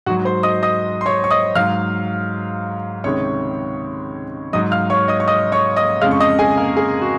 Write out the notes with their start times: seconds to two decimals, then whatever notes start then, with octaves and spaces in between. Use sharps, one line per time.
0.06 G#2 F#4 F#5
0.10 F#3
0.25 C5 C6
0.43 D#5 D#6
0.63 D#5 D#6
1.01 C6
1.06 C#5 C#6
1.24 C#6
1.31 D#5 D#6
1.55 G#2 F#3 F5 F6
3.04 C#2 C3 D#3 G#3 C#5 C#6
4.53 G#2 F#3 D#5 D#6
4.71 F5 F6
4.90 C#5 C#6
5.08 D#5 D#6
5.20 C#6
5.28 D#5 D#6
5.52 C#5 C#6
5.76 D#5 D#6
6.01 F2 C#3 G#3 F5 F6
6.11 C#6
6.20 D#5 D#6
6.39 G#4 G#5
6.57 A#3 A#4
6.77 G#4
7.01 F#4